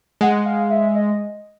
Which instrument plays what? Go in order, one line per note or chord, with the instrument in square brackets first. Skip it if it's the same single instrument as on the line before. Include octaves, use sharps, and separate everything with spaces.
[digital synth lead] G#3 [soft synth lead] F#5
[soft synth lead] F5
E5
D#5